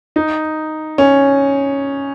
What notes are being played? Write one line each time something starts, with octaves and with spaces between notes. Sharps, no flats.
D#4
C#4